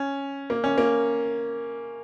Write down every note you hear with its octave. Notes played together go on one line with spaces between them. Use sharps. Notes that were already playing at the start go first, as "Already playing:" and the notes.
Already playing: C#4
A#3
C#4
A#3